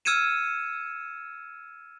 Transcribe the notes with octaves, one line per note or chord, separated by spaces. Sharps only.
E6 F6 G#6 C#7 D#7 E7